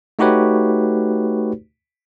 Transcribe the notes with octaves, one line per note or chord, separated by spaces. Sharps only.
A3 D#4 F#4 G4 B4 C#5